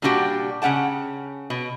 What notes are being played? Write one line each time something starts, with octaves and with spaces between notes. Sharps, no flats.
A#2 G3 D4 F#4 G4 G5
C#3 C#4 F#5 G5 A5
B2